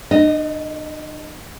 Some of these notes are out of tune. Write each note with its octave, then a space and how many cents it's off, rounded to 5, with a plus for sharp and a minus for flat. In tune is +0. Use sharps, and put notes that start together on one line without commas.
D4 +45 D#5 +0